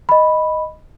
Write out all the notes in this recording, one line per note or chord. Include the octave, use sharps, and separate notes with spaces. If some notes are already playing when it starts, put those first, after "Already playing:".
D#5 B5